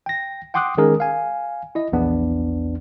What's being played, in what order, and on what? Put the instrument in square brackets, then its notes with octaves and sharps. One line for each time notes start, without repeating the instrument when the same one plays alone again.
[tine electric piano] G5 A#6
F#5 G5 C6 D6 D#6 F#6
D#3 G#3 C#4 G#4 A#4
F5 G#5
E4 D#5
A#1 E2 B3 D4